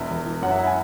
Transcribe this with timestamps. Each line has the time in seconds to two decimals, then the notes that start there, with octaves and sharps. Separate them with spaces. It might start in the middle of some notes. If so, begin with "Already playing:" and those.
Already playing: E1 E2 E5
0.10 E1
0.26 E3
0.42 F#2 F#5
0.51 E5
0.59 E4 F#5
0.67 G#5